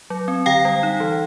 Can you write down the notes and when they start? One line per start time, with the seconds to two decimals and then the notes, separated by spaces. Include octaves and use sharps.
0.10 F#3
0.28 C4
0.46 D3 F5 G5
0.65 G3
0.83 D#4
1.00 E3